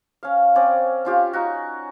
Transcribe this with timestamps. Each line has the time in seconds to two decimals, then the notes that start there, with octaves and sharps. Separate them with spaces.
0.23 C#4 F5
0.55 C4 C#4 D5
1.05 C#4 F4 G4
1.33 D#4 F#4